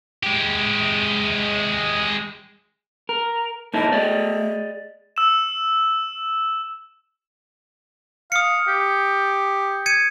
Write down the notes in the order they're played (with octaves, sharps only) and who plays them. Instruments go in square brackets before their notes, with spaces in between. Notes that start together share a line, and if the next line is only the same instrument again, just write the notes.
[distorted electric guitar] G#3 G4
[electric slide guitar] A#4
[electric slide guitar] A#3 D#4 E4 [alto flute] A5
[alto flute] A3 [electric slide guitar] G#4 D5 D#5
[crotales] E6 E7
[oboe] F5 [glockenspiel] D#6 C#7
[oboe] G4
[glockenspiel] G#6 C#7 D#7